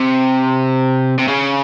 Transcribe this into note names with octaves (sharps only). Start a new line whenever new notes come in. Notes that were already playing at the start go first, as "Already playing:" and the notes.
Already playing: C3
C3
C#3